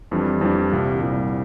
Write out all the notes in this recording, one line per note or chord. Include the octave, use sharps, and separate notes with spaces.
F2 E3 G3 D4
F2 E3 G3 D4
C2 A#2 G3
C2 A#2 G3